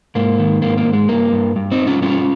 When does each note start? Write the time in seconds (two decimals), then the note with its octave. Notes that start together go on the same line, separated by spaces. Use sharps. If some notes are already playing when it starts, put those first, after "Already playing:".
0.15 G#2 A#3
0.38 D#3
0.62 G#2 A#3
0.78 A#3
0.86 G#2
0.93 G#3
1.09 G2 A#3
1.32 G2
1.56 G2
1.71 C4 D#4
1.79 G2
1.87 C#4 F4
2.02 G3 C#4 F4